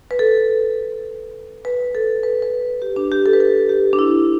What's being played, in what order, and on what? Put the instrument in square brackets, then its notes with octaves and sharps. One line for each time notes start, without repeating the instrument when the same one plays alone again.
[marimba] B4
A4
B4
A4
B4
B4
G4
D4
G4
A4
B4
A4
G4
D4
E4